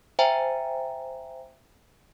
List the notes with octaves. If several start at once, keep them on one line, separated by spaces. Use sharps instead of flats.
C5 E5 G5 G#5 A#5